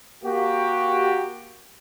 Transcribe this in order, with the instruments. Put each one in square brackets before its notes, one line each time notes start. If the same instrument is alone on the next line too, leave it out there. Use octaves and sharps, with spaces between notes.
[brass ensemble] A#3 F#4 G4